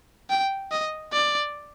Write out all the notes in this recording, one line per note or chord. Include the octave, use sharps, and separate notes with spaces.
G5
D#5
D5